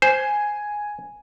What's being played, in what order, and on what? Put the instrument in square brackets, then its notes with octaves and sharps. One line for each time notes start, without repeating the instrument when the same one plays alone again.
[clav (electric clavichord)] C5 [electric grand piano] G#5